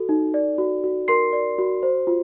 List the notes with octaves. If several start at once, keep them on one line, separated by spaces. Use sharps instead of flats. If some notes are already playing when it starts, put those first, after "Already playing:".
Already playing: F#4 A4
D#4
D5
F#4
F#4
A#4 C6 C7
D5
F#4
C5
F4